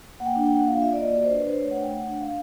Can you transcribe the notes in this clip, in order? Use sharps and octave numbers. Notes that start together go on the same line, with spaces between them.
A#3 F#5
G5
D4 F#5
G5
A#3 F#5
F4 F5
F4 E5
D5
A#3 D#5
F#4 D5
D4 C5
B4
D4 C5
A3 C#5
A3 F#5
G5
A3 F#5
D4 F#5
D4 F5